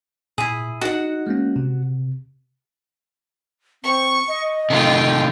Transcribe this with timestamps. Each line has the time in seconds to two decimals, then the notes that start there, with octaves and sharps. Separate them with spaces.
0.38 A#2 E4 G#4
0.81 D#4 F#4 G#4 D#5 F#5
1.27 G#3 A#3 C#4
1.56 C3
3.83 C4 C#6
4.28 D#5
4.70 C3 D#3 A3 F4 G5